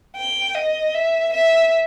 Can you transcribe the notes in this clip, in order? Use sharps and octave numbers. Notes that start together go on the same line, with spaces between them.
G5
D#5
E5
E5